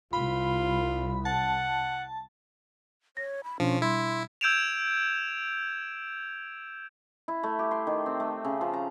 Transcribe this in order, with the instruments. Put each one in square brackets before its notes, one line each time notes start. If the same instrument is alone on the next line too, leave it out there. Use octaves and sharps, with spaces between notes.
[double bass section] C2 [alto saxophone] F4 [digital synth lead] B5
[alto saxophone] F#5 [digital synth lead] A5
[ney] C#5 [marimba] A#6
[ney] B5
[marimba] B2 D4 [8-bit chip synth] F3 [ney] C#4
[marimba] G3 [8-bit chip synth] E4 [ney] C6
[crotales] E6 G6 G#6 D7 E7 F7
[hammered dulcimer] E4
A3
G4
C6
D#3
C4
A3
C#3
F3
A#5